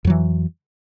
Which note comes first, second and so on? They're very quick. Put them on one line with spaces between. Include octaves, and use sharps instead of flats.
F2 F#3 E3